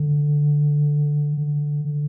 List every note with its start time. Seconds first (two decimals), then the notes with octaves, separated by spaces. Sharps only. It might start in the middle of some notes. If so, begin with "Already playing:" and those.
Already playing: D3
1.37 D3
1.85 D3